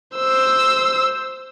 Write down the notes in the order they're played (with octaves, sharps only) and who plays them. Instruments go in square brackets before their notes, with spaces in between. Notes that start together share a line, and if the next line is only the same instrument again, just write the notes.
[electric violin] C5 E6